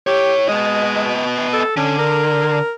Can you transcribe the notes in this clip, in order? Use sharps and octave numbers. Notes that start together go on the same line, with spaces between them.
E4 G4 C#5
G#3 B3 D#5
A4
D3 C#4
A#4